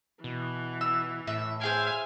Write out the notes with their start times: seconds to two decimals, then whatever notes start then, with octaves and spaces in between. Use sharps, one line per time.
0.24 B2 E3
0.81 E6
1.27 A2 E5
1.61 E4 G#4 C5 F5 G#5